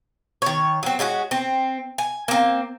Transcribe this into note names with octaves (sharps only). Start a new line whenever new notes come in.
D#3 C#5
F#3 C4
G#3 C#4 F4 F#4
C4
G#5
A#3 C4